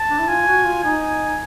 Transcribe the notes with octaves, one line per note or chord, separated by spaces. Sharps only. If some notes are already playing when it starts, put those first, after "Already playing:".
Already playing: A5
D4
E4
F4 G#5
F#4
F4
D#4 G#5